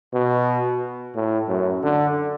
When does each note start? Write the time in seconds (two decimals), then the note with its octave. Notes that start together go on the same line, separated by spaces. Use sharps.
0.14 B2
1.15 A2
1.48 F#2
1.83 D3